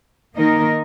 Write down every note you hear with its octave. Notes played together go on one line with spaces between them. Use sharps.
D#3 A#3 D#4 A#4 D#5